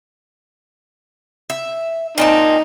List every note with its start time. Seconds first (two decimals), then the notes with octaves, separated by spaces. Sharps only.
1.50 E5
2.18 A#2 C4 D#4 A5